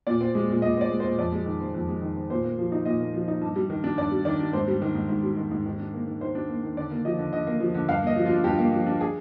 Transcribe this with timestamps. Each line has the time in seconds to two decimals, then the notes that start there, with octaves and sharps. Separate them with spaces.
0.07 A#2 D5
0.21 C4
0.35 G#3
0.49 A#2
0.62 A#2 D#5
0.77 C4 D5
0.91 G#3
1.00 A#2 C5
1.18 F2 D5
1.32 G#3
1.46 D#3
1.61 C4
1.74 F2
1.88 G#3
2.02 D#3
2.16 C4
2.30 A#2 C5
2.45 A#3
2.58 F3
2.72 D#4
2.85 A#2 D#5
3.00 A#3
3.14 F3
3.28 D#4
3.42 G2
3.56 G3
3.70 D#3
3.84 D4
3.98 G2 D5
4.12 G3
4.25 D#3 D5
4.40 D4
4.53 G#2 C5
4.68 G3
4.82 D#3
4.95 G#2
5.09 G#2
5.23 G3
5.37 D#3
5.51 G#2
5.66 D#3
5.79 D4
5.94 A#3
6.07 D#3
6.21 D#3 C5
6.35 D4
6.49 A#3
6.63 D#3
6.77 D3 D5
6.91 A#3
7.05 F3 D#5
7.19 D3
7.33 D3 D#5
7.47 A#3
7.60 F3
7.74 D3
7.88 G2 F5
8.03 A#3 D#5
8.16 F3
8.26 F4
8.31 D4
8.44 G2 G4
8.58 A#3
8.73 F3
8.86 D4
9.01 G#4